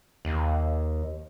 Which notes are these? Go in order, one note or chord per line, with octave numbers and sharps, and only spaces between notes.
D#2